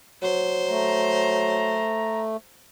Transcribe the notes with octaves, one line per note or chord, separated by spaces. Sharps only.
F#3 C5
A3 A#5